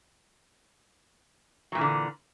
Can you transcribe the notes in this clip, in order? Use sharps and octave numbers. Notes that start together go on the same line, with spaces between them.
A#2 D3 E3 F#3